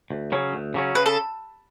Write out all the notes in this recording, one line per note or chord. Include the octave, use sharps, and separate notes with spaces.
D2
C#3 F#3 C#4
D2
C#3 F#3 C#4
C#3 B4
A4